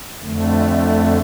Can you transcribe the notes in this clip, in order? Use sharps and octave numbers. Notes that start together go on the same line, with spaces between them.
F2 D3 A3